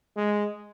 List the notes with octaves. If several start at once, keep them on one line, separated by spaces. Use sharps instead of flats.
G#3